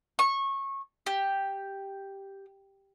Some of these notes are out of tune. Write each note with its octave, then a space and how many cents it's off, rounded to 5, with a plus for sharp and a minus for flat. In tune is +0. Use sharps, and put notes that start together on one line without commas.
C#6 -20
G4 +0